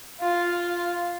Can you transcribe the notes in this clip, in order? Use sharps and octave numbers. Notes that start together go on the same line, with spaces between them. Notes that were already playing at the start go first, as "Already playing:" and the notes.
F4